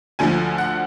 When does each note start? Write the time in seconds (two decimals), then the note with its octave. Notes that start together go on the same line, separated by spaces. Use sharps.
0.19 D2 D3 F3 G#5
0.58 F#5